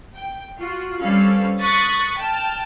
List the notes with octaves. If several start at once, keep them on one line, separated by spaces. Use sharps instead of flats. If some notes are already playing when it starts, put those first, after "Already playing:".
G5
F4 F#4
G3 C4 C#4 A4 B4 F5
C#6 D#6 F#6 A6 B6
G5 A5 F6